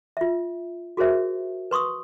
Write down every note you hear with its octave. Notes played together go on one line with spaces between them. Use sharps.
F4 E5
F#4 G#4 A#4 C5 E5
B4 C6 C#6 D#6 E6